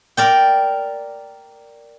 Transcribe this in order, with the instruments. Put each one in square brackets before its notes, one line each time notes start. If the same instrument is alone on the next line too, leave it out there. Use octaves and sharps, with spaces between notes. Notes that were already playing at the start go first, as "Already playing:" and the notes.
[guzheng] A#4 D5 G5